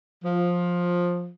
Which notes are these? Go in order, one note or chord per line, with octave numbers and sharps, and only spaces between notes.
F3